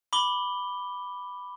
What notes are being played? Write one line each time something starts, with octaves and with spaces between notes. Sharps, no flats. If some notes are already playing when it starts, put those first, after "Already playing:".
B5 D6 G7